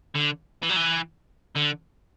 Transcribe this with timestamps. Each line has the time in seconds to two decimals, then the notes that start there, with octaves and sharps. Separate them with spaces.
0.15 D3
0.63 E3
0.69 F#3
0.76 E3
1.56 D3